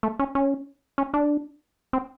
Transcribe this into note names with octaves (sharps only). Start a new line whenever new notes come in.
A3
C#4
C#4
C#4
D4
C4